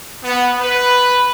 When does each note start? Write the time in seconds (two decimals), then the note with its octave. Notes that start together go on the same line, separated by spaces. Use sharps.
0.24 B3
0.61 B4